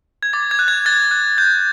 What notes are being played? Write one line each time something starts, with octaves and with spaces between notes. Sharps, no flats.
G#6
D6 A6
G#6
F#6
G#6
F#6 A6
F#6
G6